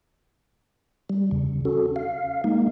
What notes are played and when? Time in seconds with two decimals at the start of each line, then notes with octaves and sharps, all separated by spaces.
1.10 G3
1.31 E2 C#3
1.65 C#4 F#4 A4
1.96 F5
2.44 G#3 A#3 D#4